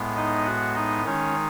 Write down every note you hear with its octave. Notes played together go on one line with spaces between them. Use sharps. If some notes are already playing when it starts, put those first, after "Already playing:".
Already playing: A2 G#3 B3
D#4 D#5
F#4 F#5
D#4 D#5
D#3 G#3 C#4 D#4 C#5